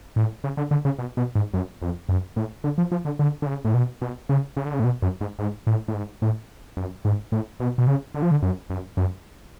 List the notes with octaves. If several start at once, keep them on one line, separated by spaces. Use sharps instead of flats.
A2
C#3
D3
D3
C#3
B2
B2
G#2
F#2
F2
F#2
A2
D3
F3
F3
D3
D3
D3
C#3
A2
B2
B2
C#3
C#3
D3
C#3
A2
B2
F#2
G#2
G#2
A2
A2
G#2
A2
F#2
G#2
A2
B2
B2
C#3
D3
F3
D3
F#2
F#2
F#2